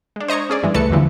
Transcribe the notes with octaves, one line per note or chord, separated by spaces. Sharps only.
G#3 D4
C5 D#5 A#5 C#6 G#6
C#4 G#4 D5
G2 E3 G#3
C#2 A3 A4 B4 A5 C#7
E2 G2 D3 E3 F3